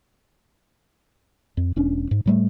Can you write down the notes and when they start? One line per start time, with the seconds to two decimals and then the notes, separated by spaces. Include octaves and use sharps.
1.57 F2
1.76 E1 C#4 D4
2.11 G#2
2.26 A2 G3 A3